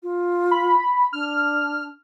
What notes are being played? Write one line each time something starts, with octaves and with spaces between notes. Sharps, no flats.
F4
B5
D4 F6